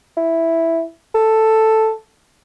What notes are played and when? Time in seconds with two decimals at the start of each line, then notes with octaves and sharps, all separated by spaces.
0.17 E4
1.15 A4